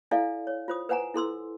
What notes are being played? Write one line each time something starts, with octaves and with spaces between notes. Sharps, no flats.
E4 A4 D5 E5 F5 G#5
C#5
F4 C5 D#6
B4 C5 F#5 G#5 A#5
E4 A4 C6 E6